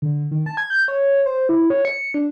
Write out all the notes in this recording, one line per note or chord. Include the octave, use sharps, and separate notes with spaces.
D3
D#3
A5
G#6
G6
C#5
C5
E4
C#5
C#7
D4